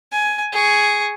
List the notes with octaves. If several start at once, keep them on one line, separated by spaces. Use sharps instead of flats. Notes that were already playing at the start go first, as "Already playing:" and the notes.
G#5
G#4 C#6